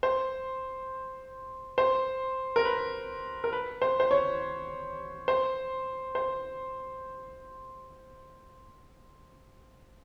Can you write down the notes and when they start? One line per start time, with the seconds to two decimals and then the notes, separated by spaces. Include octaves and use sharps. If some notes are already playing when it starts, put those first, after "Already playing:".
0.03 C5
1.78 C5
2.56 A#4
2.65 B4
3.44 A#4
3.53 B4
3.82 C5
4.00 C5
4.11 C#5
5.28 C5
6.15 C5